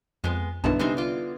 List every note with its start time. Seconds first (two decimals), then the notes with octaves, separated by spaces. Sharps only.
0.24 F2 G#3 B3
0.64 B1 G2 D3 D#3 B3 E4 A5
0.79 C3 G3 G#3 C4 D#4
0.97 F4 D5